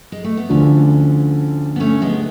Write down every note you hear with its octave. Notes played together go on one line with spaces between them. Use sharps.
G#3
A3
B3
D2 D3 F3 A3 C#4
B3
A3 C#4
G#3 B3